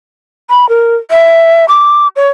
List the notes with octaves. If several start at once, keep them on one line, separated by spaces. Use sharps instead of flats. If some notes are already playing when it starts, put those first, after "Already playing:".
B5
A#4
E5
D6
C#5